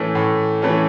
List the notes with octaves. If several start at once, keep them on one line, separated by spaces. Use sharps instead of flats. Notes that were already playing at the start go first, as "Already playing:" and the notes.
Already playing: A2 E3 A3 C#4
A2
E3 A3 C#4